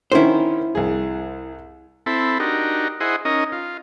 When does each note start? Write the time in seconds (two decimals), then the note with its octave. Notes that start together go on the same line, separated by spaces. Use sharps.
0.12 D3 D#3 C#4 E4 C5
0.75 C2 G#4
2.06 C4 E4 A4 B5
2.40 D4 D#4 F#4 G4 A#4
3.00 E4 G#4 C5 D#5 F#5
3.25 C#4 D#4 A#4 D#5
3.52 F4